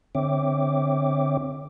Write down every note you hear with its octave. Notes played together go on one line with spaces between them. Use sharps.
D3 C4 C#5 E5 G5 D6